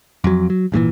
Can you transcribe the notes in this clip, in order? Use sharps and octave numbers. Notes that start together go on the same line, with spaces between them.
F2 F#3
F#3
G#1 G2 A#2 E3